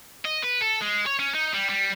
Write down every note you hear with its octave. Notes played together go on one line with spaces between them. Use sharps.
D#5
B4
A4
G#3
C#5
C#4
D#4
G3
G3